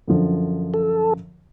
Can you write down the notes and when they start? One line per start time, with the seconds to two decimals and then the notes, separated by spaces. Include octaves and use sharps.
0.07 F#2 D3 F3
0.74 A4